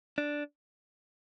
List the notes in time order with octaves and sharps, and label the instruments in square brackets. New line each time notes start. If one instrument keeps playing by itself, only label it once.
[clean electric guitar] D4